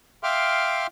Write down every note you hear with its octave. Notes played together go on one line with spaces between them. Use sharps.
E5 F5 G5 C6 D6 F6